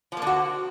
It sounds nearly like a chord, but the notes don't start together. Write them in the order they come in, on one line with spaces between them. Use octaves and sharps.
F3 A#3 D3 F#4